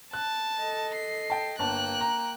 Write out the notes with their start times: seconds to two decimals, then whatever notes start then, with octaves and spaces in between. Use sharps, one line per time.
0.13 A5 F#6
0.59 A4 D#5
0.95 C7
1.30 G5 A5
1.59 G1 A#3 G5 A5 F#6
2.01 A#5